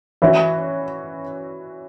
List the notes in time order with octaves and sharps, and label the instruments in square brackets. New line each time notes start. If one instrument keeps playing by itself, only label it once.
[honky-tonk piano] E3 C#4 F#4 [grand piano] E5